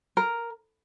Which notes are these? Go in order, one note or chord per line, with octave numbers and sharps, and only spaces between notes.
A#4